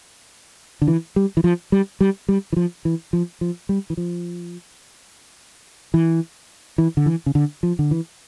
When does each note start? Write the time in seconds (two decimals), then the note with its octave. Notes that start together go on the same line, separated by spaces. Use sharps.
0.82 D3
0.87 E3
1.16 G3
1.37 E3
1.44 F3
1.72 G3
2.01 G3
2.29 G3
2.53 E3
2.56 F3
2.85 E3
3.13 F3
3.41 F3
3.69 G3
3.90 E3
3.97 F3
5.94 E3
6.78 E3
6.97 D3
7.06 E3
7.26 C#3
7.35 D3
7.63 F3
7.79 D3
7.91 E3